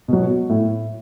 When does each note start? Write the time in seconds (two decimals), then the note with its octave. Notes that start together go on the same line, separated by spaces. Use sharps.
0.08 B2 F#3
0.49 A2